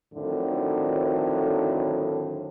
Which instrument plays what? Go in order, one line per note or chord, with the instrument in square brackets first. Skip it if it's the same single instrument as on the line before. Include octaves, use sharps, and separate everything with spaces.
[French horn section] F2 A2 D3 D#3 F#3